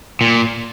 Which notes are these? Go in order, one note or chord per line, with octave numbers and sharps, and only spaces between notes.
A#2